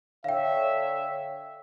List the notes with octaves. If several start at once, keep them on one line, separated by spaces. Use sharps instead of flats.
D3 C#5 E5 F5 G5